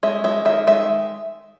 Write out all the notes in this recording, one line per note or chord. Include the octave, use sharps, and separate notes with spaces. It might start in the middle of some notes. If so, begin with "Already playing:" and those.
G#3 E5
G#3 E5
D#3 E5
G#3 E5